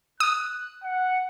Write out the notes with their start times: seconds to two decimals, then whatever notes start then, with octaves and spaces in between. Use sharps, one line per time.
0.20 D#6 F#6
0.83 F#5